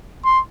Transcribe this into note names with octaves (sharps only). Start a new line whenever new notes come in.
C6